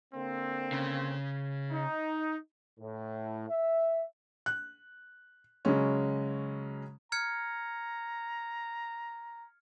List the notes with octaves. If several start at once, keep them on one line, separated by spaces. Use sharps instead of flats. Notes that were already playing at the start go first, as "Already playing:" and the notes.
D3 A#3 C4
C#3
D#4
A2
E5
F#6
C#3 F#3 G#3 C#4
A#5 F6 G#6 C#7